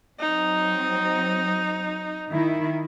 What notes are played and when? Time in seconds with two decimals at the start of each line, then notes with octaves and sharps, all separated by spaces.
0.19 F#3 C4 D#4
2.30 D#3 E4